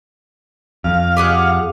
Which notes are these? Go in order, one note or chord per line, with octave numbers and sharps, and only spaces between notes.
F2 F5
G4 G#4 F#5